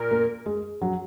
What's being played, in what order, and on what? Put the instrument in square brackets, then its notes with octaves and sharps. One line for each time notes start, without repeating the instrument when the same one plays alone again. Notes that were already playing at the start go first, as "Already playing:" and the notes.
Already playing: [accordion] A#2 A#4
[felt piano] A#3
G#3
F#3